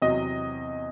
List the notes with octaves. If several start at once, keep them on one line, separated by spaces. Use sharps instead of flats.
E2 C3 F#3 D#5